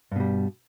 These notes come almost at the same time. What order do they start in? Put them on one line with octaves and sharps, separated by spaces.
G2 B2 G3